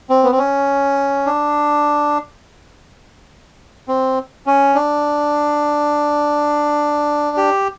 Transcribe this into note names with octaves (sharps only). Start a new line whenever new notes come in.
C4
B3
C4
C#4
D4
C4
C#4
D4
G4